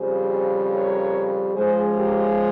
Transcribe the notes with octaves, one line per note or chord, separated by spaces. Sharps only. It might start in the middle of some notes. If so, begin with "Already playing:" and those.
Already playing: F2 C#3 G3 G#4 C5
A#4 C#5
C#3 F3 G#3 G#4 C5
G4 A#4